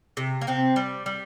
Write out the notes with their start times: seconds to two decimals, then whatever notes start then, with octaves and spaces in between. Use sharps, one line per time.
0.17 C3
0.41 A#3
0.47 C3 C4
0.76 G3
1.06 G3